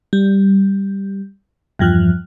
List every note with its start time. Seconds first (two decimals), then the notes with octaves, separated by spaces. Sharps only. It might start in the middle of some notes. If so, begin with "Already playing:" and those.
0.13 G3
1.79 E2 G2 F3 F6 F#6